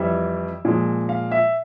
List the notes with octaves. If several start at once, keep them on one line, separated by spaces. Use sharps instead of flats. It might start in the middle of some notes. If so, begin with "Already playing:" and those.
Already playing: F2 E3 G3 E5
A#2 F3 G#3
F5
E5